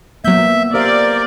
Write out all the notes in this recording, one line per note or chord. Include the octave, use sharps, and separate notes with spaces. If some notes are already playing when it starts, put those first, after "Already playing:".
F#3 A#3 B3 E5 G6
G4 A#4 C5 D5 F5